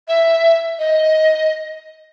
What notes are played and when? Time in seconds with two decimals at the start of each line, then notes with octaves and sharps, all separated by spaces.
0.08 E5
0.79 D#5